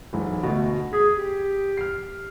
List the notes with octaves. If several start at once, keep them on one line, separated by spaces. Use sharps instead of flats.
B1 G#2 E3
D2 B2 A3
G#4 B6
G4
F6 C7